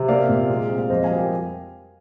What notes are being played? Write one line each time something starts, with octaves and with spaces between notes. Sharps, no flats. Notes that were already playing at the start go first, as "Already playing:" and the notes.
Already playing: C3
A#3 D5 F5
A#2
G#3
C4
F5
F2 C5 D#5
F5 G#5
G3
G4 A#4